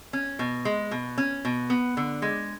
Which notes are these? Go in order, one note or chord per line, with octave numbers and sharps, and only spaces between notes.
C#4
B2
G#3
B2
C#4
B2
B3
D3
G#3